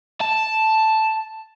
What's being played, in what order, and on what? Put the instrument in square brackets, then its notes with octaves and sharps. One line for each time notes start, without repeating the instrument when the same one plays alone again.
[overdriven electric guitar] A5